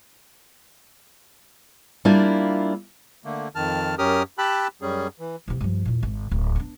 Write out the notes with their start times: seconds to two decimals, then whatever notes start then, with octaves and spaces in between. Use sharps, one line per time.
2.05 G3 A#3 D4 E4 F4
3.25 D3 A3 A#3
3.55 F2 D#3 A5 F6
3.98 F#2 C#4 G4 A#4 D#6 F6
4.38 G4 G5 A5 B5 E6 F#6
4.82 F#2 G3 C#4 G#4
5.20 E3
5.48 E2 C3
5.61 G2 F3
5.85 E2 A#2
6.03 G#1
6.31 D1
6.56 B3 D4